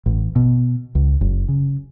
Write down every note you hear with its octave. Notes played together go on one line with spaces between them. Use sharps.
A1
B2
C#2
F#1
C#3